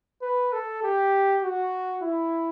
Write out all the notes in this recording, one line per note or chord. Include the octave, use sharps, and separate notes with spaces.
B4
A4
G4
F#4
E4